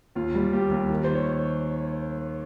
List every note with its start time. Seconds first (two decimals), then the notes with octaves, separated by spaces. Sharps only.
0.15 D#2 F4
0.35 G3
0.53 D#2 G4
0.71 D#2
0.90 D#3
1.04 C5
1.15 C#5